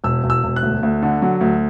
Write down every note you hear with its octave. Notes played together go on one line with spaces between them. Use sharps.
E1 E6
E1
E6
E1
F#6
D2
D2
D3
F#3
D2